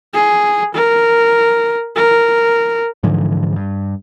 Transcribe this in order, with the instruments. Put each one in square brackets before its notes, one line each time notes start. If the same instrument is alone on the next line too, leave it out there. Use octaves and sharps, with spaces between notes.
[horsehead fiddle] G#4
A#4
A#4
[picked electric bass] G#2 D3 E3 F3
G2